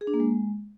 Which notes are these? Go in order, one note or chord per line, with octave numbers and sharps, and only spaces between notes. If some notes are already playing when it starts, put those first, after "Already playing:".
G#4
D4
A#3
G#3